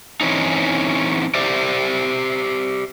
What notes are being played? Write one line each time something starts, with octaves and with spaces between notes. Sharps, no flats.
E3 C4 C#4 D#4
G4 C5 D5 E5